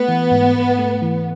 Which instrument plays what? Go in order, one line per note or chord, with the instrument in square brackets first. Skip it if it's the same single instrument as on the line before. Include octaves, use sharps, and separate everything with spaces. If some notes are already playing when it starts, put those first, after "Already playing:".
Already playing: [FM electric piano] A3 [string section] B3
[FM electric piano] E3
G#2
G#2
A3
E3